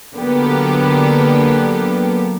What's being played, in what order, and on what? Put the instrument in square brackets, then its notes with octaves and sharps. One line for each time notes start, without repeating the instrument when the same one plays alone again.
[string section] D3 F#3 A#3 B3 G4